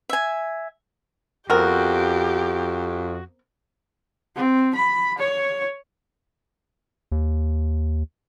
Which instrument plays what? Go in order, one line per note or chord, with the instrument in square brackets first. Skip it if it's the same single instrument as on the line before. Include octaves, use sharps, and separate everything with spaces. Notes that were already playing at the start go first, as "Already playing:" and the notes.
[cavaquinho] E5 G#5
[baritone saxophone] F2 [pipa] B3 C4 A#4 [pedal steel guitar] F#4 [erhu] G4
[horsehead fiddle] C4
B5
C#5
[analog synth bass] D#2